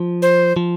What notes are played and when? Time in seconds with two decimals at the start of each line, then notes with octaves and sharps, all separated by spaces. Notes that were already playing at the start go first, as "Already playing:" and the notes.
Already playing: F3
0.22 C5
0.56 F3